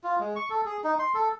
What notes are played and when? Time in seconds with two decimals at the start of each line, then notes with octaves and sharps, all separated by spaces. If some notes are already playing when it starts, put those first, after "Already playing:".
0.04 F4
0.20 G#3
0.36 C#6
0.50 A4
0.65 G#4
0.84 D#4
0.99 C6
1.14 A4